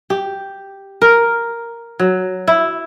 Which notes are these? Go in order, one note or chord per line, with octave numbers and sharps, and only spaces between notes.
G4
A#4
F#3
E4